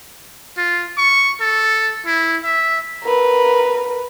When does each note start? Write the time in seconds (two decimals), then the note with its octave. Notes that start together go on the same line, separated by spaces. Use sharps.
0.57 F4
0.97 C#6
1.40 A4
2.06 E4
2.44 E5
3.03 A#4 B4